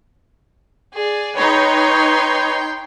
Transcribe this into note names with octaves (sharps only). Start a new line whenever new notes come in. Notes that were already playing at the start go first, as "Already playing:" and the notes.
G#4 D5
D#4 B4 C#5 G5 C6